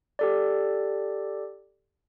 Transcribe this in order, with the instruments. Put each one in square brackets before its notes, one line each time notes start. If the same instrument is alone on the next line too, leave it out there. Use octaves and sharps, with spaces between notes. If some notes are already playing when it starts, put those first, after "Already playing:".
[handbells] G4 A4 D5